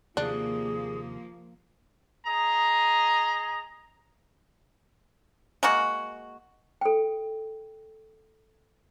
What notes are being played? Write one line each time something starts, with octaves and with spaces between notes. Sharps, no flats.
D#2 C3 F3 A#3 D4 G#4
G#4 D#5 A#5
G#3 A#3 F#4
A4 G5